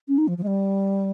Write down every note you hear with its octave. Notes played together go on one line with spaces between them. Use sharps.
C#4
D#4
F3
F3
G#3
G3